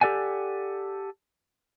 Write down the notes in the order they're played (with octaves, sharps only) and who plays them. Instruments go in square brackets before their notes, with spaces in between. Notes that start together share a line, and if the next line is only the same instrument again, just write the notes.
[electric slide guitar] G4 A4 D5 F#5 G#5